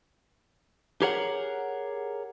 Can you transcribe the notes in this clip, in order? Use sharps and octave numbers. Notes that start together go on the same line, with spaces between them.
G4 G#4 A#4 C#5 F#5